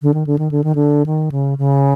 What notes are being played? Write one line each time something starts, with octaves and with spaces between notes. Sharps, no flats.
D3
D#3
D3
D#3
D3
D#3
D3
D#3
C#3
C#3